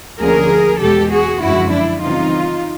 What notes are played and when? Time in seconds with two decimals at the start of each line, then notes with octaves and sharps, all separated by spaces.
0.20 D2 D3 F3 A#3 C#4 G#4 A#4
0.81 E2 B2 G#3 G4 A4
1.12 F#4 G#4
1.42 F#2 D3 F3 G#3 E4 F#4
1.72 D4 E4
2.03 C#3 E3 G3 C4 D#4 F4